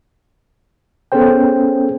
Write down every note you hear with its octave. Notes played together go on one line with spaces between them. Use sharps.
B3 C#4 G#4 A4 C5 G5